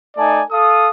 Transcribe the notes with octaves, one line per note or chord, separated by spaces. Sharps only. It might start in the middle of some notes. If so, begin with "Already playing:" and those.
A3 D#4 D5 G#5 A5
A4 F5 D#6